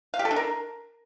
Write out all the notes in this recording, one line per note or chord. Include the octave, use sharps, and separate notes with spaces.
F5
G4
A4
D4
A#4